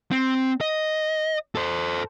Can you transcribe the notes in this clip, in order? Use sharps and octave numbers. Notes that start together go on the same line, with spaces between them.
C4
D#5
A4 C5